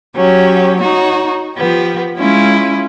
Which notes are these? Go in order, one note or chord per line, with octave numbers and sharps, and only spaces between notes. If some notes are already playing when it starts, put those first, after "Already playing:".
F#3 C#4 G4
D#4 F#4 C#5
F3 B3 G4
G#3 C#4 E4 F4